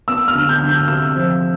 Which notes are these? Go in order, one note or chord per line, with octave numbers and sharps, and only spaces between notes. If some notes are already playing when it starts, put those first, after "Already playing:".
B3 E6
F6
D3
G6
D3
G6
C3 E6
F3